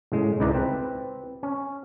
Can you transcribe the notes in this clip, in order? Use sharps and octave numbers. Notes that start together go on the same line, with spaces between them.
A2 C#3 G#3
C#2 D#4 E4 B4 D5 A#5
C4 B4
C#4